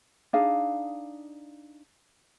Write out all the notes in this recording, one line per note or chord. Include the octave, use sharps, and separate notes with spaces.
D4 D#4 G#4 F5